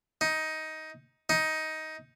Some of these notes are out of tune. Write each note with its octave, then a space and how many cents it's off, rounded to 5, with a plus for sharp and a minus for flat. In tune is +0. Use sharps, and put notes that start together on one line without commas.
D#4 +15
D#4 +15